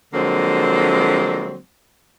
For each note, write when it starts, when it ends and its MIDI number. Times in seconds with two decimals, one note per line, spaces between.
0.14 1.56 50
0.14 1.56 53
0.14 1.56 54
0.14 1.56 56
0.14 1.56 58
0.14 1.56 60